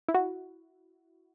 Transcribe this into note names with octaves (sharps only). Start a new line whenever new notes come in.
E4
F#4